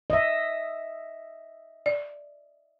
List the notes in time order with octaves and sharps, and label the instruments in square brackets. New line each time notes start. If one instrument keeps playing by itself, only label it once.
[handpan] D#5 E5
[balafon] D5